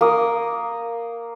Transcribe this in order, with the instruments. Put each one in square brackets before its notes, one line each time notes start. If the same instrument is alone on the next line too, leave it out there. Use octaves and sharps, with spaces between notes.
[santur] A#3 D#6